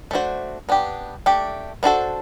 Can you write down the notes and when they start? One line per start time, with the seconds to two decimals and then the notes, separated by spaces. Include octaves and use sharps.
0.11 A3 D4 F#4 C5
0.69 B3 D4 G4
1.26 A3 D4 G4
1.83 B3 D4 F#4 A4 C5